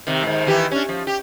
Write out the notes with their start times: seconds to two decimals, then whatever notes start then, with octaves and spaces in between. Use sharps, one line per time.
0.07 C3 D#3
0.23 G#2 D#3
0.46 D#3 E3 G4
0.71 C#4 D4
0.89 F3
1.07 G4